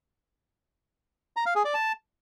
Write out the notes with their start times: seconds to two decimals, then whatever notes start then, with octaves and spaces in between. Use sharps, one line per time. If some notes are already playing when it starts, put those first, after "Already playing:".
1.37 A#5
1.46 F5
1.55 G#4
1.65 D5
1.74 A5